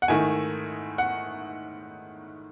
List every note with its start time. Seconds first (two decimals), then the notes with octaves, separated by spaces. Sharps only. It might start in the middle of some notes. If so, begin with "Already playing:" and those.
0.02 F#5
0.08 G#2 D#3 A3 E4 G#5
0.98 F#5